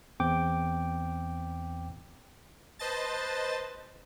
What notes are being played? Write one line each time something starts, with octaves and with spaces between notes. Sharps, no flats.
E2 C4 G5 D6
B4 C5 D#5 A5 A6